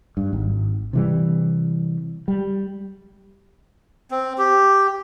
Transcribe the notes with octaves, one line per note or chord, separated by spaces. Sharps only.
G2
G#1
C3 E3 G3
G3
C4
G4